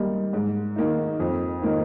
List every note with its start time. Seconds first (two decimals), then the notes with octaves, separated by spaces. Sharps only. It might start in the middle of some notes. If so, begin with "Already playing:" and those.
Already playing: D#3 G3 A#3 D#4
0.33 G#2
0.76 D#3 A#3 D#4
1.19 F2
1.62 D#3 A#3 D#4